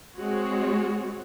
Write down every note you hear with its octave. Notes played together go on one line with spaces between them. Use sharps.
G#3 C4 F#4 C#5